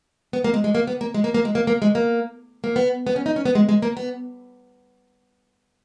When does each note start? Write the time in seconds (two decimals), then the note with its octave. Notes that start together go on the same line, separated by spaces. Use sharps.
0.33 B3
0.44 A#3
0.54 G#3
0.64 G#3
0.75 A#3
0.87 B3
1.01 A#3
1.14 G#3
1.24 A#3
1.34 A#3
1.45 G#3
1.55 A#3
1.67 A#3
1.82 G#3
1.95 A#3
2.64 A#3
2.76 B3
3.07 B3
3.16 C#4
3.26 D#4
3.36 C#4
3.45 B3
3.55 G#3
3.69 G#3
3.82 A#3
3.97 B3